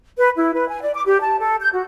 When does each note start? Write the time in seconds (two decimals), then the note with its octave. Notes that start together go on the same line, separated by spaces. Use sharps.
0.18 B4
0.36 E4
0.53 B4
0.69 G#5
0.81 D5
0.94 D6
1.06 G4
1.20 A5
1.39 A4
1.61 G6
1.73 F#4